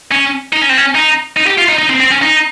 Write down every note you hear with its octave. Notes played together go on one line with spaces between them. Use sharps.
C#4
D#4
C#4
C4
C#4
D#4
D#4
G4
F4
D#4
D#4
C4
C4
C#4
D#4